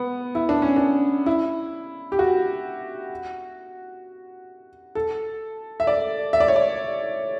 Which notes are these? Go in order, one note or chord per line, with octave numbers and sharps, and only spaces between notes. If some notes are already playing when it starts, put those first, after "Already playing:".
Already playing: B3
E4
D4
C#4
D4
E4
G4
F#4
A4
E5
D5
E5
D5
C#5
D5